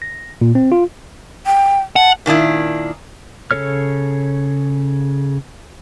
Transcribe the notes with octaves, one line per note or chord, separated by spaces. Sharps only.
A#6
A#2
C4
F4
G5
F#5 A5
A#2 D#3 D4 E4
C#3 D4 A4 C#5 F6